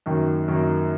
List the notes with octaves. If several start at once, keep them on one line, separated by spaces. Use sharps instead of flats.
F#2 D#3 A#3
F#2 D#3 A#3